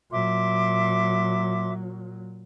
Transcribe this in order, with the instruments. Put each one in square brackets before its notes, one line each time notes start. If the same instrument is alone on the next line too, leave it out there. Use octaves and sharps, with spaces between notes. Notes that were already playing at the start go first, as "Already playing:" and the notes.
[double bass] A#2 F#3 [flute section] E5 C6 D6